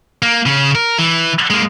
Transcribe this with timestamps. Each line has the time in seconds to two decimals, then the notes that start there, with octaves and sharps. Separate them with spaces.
0.22 A#3
0.46 C#3 C#4
0.75 A#4
0.99 E3
1.50 G#3 A#3